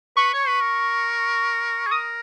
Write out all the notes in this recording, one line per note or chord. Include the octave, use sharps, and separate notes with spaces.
B4 C#6
C#5
B4
A#4
G#4
A#4 D#6